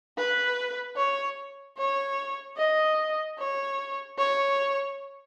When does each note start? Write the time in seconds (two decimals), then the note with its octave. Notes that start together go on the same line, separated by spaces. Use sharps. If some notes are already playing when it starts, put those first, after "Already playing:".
0.18 B4
0.97 C#5
1.78 C#5
2.57 D#5
3.39 C#5
4.18 C#5